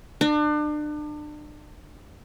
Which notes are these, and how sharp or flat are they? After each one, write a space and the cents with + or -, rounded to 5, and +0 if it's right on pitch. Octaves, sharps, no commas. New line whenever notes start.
D4 +35